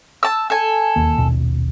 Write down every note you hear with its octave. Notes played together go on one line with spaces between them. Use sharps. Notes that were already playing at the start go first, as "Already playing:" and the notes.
A5 E6
A4 G#5
E1 D#2 A#3
A#1 D#2 B2